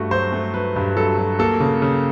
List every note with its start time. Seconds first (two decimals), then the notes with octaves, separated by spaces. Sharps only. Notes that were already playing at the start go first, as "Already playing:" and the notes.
Already playing: G2 A3 F#4
0.11 F#3 C5
0.33 A3
0.54 F#3 B4
0.76 G2
0.96 F#3 A4
1.18 F#3
1.39 A#3 A4
1.60 C#3
1.82 C#3